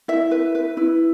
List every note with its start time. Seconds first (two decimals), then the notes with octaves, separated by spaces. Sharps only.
0.08 E4 E5
0.31 B4
0.55 B4
0.77 E4